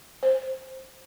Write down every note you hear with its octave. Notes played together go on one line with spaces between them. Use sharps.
C5